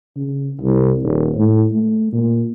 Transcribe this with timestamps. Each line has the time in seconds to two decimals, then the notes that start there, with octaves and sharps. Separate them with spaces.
0.16 C#3
0.61 C2
1.03 D#1
1.38 A2
1.73 A3
2.13 A#2